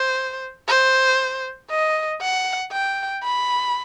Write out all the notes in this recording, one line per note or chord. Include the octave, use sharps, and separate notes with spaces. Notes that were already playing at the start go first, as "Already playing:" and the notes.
Already playing: C5
C5
D#5
F#5
G5
B5